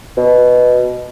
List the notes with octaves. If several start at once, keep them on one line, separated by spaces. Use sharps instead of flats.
B2